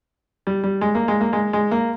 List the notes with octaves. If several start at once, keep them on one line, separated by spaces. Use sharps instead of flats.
G3
G3
G#3
A#3
G#3
A#3
G#3
G#3
A#3